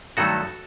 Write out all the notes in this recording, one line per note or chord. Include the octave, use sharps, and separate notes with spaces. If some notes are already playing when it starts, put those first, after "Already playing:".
G2 D#3 F#3 A3 F#4 A4